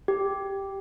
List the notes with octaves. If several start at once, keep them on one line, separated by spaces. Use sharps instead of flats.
G4